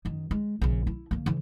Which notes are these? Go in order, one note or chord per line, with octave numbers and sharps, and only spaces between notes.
F#2 D#3
G#3
A#1 C#3
E4
D3 A#3
C#3 E3